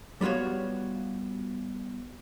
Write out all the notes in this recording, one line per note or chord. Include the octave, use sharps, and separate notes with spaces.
G3 B3 F4 F#4 C#5